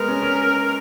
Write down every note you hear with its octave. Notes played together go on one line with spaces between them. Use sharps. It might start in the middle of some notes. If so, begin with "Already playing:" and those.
Already playing: G#3 B3 A#4
C#4
C#4